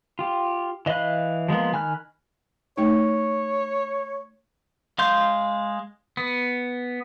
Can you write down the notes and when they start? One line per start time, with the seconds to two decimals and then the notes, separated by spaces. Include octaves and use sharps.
0.19 F4 G4
0.86 E3 D#5 F5 B5 F#6
1.48 F3 G#3 A#3 B3
1.73 D#3 G#5 B5 F6 F#6
2.77 A3 D#4 C#5
4.98 G#3 F5 C6 G6
6.17 B3